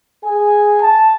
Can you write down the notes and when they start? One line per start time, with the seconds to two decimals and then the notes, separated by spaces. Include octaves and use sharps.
0.24 G#4 G#5
0.82 A5